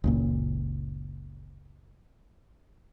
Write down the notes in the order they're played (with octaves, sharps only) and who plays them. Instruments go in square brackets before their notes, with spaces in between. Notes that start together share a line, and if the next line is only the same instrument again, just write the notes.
[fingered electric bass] F#1 C#2 A#2